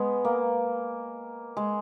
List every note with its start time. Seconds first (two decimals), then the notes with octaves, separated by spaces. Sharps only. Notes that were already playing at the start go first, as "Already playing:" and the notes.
Already playing: G#3 B3
0.25 A#3
1.57 G#3